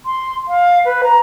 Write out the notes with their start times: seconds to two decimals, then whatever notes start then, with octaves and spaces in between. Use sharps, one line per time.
0.06 C6
0.48 F5
0.85 B4
1.04 A#5